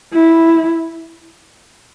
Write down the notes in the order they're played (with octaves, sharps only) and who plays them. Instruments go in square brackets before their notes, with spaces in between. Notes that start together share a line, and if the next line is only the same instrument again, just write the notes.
[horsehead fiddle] E4